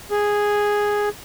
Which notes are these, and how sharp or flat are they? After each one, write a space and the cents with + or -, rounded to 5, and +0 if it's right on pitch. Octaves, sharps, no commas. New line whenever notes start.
G#4 -5